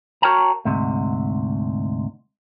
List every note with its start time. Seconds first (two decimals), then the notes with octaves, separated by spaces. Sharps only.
0.22 F#4 A#4 C#5 G5 A5 A#5
0.65 D2 G#2 C3